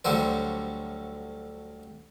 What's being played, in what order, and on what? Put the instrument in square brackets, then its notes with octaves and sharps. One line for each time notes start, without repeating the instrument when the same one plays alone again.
[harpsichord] D2 D3 F#3 G3 C5